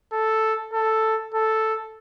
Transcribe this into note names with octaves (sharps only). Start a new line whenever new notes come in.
A4
A4
A4